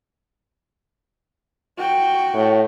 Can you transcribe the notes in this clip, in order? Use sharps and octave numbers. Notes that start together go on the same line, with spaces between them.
F#4 G5
A2